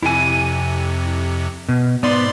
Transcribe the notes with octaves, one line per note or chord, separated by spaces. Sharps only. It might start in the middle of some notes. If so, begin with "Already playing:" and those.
F2 C3 E4 G#5
B2
G#2 B3 D5 C6